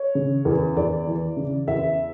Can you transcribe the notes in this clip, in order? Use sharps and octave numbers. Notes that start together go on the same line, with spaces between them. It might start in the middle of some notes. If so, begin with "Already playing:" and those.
Already playing: C#5
C#3
E2
E2 D5
E3
C#3
E2 E5